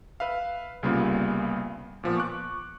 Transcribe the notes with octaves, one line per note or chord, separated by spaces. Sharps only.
B4 E5 F5
C2 C#3 G3 A#3 B3 F4
A#2 F3 B3
C#6 D6 F#6